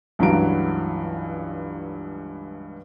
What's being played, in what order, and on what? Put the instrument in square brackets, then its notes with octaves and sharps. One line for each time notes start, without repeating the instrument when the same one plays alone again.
[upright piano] C#2 G2 E3 F#3 A#5 D7